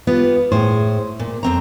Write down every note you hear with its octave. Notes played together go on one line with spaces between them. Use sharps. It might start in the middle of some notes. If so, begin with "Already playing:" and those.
B3 F4 G4
A2 G#4 C5
A#2
F2 C4 A#5